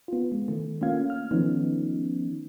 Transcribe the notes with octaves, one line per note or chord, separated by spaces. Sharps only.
B3 F4
G#3
D#3 A3
A3 A#3 C#4 F4 F5 G#6
F6
D#3 F3 A3 B3 C#4 D#4